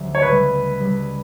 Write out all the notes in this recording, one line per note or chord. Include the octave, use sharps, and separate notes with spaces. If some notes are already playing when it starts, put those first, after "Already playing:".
Already playing: D2 D3 F#3 C#4 G4
C#5
C#2 C#3 G3 B4
C#2 C#3 G3